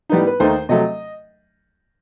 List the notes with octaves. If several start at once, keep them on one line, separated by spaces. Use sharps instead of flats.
A2 G3 B3 D#4
B4
D#2 D#3 A3 D#4 C5
C3 F#3 A3 D#5